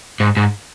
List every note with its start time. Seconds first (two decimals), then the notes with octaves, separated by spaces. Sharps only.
0.20 G#2
0.37 G#2